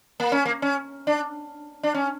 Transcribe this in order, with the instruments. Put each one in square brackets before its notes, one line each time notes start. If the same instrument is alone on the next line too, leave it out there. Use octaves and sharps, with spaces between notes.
[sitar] A#3
C#4
A#3
C#4
D4
D4
C#4